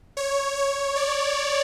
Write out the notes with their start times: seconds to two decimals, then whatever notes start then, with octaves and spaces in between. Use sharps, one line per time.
0.17 C#5
0.56 C#5
0.96 D5